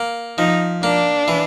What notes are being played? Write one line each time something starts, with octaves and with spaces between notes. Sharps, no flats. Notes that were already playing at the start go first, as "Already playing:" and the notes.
Already playing: A#3
F3 D#4
A#3 D4
E3